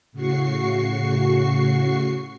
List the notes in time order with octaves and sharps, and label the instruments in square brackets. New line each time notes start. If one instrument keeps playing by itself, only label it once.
[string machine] A2 C#3 F#4 C#6 C7